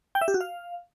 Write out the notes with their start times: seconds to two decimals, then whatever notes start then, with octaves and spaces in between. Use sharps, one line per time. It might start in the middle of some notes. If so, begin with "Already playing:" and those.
0.15 G5
0.21 E5
0.28 G4
0.34 F#4
0.41 F5